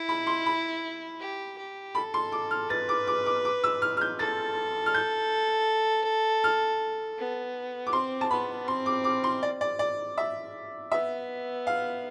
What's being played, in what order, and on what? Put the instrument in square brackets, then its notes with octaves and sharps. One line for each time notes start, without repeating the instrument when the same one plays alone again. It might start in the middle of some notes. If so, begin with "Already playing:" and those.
Already playing: [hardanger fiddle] E4
[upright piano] B5
C6
B5
[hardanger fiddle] G4
G4
[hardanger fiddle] A4 [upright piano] B5
[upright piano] C6
D6
F6
[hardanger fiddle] B4 [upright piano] A6
[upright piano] D6
D6
D6
D6
E6
F6
F6
G6
[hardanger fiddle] A4 [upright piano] A6
[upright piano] F6
G6
F6
[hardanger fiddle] B3
[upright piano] D6
[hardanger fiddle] C4 [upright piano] C6
[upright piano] A5
[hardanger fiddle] B3 [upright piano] B5
[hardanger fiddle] C4 [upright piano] C6
[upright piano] D6
D6
C6
D5
D5
D5
E5
[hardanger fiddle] B3 [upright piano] E5
[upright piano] F5